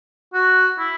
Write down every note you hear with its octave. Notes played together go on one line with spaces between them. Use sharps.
F#4
E4